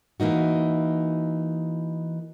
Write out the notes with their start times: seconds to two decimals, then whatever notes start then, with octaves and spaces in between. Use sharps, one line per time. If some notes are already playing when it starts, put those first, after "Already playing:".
0.20 E3 A#3 D#4 F#4